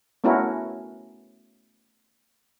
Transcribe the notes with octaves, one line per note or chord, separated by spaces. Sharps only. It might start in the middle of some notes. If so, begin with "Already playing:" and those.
A3 B3 C#4 E4 F#4 A#4